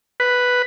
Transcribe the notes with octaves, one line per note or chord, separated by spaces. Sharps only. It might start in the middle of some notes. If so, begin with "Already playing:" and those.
B4